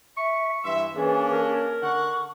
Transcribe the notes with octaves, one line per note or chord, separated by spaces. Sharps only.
E5 C#6
G2 E3 E5 C6
E3 A#3 C#4 D4 G#4
A#4
D3 F#5 C#6